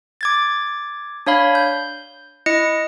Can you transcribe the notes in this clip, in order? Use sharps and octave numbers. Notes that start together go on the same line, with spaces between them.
D6 G#6 A6
D4 C#5 F5 B5
G6
E4 D#5 A#6 C#7